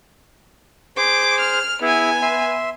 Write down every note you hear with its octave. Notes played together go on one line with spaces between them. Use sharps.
G#4 C5 D6
F6
B3 E4 G#4 G#5
E5 C6